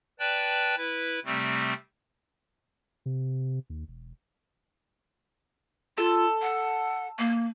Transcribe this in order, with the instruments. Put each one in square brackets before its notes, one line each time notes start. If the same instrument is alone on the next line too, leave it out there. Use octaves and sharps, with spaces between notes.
[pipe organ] B4 D5 G5 A5 F#6
E4 B4
C3 G3 A3 C4
[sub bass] C3
D#2
E1
[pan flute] F4 [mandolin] A4
[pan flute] F#5
A#3